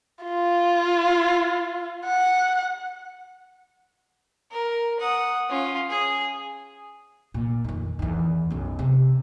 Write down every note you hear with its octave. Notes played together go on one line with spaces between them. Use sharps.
F4
F#5
A#4
F#5 D#6
C#4 F4
G#4
A#2
F2 D#3
E2 D#3
B1 F#2
C3